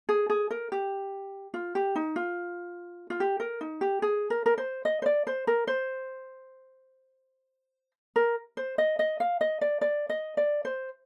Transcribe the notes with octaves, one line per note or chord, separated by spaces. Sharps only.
G#4
G#4
A#4
G4
F4
G4
D#4
F4
F4
G4
A#4
D#4
G4
G#4
A#4
A#4
C5
D#5
C5
D5
C5
A#4
C5
A#4
C5
D#5
D#5
F5
D#5
D5
D5
D#5
D5
C5